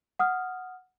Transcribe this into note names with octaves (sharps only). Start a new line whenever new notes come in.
F#5 D#6 F6